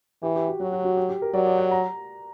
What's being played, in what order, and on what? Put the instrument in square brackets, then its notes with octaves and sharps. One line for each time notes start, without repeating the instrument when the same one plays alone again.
[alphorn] E3 [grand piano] G4
[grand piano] G4
F#4
[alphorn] F#3 [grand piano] F#4
[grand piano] F#4
F#4
G4
G4
A#4
[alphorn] F#3 [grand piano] D5
[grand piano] D5
F#5
A#5